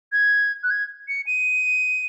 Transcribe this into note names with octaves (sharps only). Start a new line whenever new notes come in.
G#6
F#6
G#6
C#7
D#7